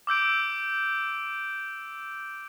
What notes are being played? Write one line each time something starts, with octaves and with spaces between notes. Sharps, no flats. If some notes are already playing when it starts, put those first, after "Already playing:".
D6 E6 G6 D7